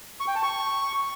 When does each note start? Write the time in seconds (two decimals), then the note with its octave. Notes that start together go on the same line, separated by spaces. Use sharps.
0.20 C#6
0.28 G5
0.35 A5
0.43 C#6